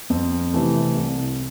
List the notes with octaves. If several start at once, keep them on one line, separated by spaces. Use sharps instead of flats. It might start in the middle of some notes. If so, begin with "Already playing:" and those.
F2
C3 E3 A3
C2